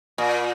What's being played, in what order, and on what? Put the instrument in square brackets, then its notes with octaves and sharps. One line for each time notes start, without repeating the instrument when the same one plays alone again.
[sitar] A#2